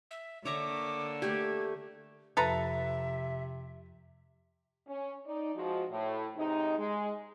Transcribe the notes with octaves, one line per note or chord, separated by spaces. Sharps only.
E5
D3 A#3 C#5 E5 A#5 D6
A3 G4 G#6
F2 C3 F3 A4 B4 E5 A#5 F#6
C#4
D#4 D5
F3 G#3 F#4
A2
G#2 C3 G#3 D#4
G#3